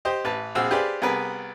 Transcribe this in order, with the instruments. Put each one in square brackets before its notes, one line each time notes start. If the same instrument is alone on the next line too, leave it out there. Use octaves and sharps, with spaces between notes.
[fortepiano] G4 C5 D#5
A1 B4 A5
A#1 C4 F#4 G#4 F5 E6
G4 G#4 B4 C5 D5 F5
C2 B3 G#4 A#4 B4